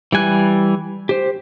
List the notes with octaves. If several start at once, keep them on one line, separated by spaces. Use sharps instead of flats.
E3 G3 G#5 F#6
G4 C5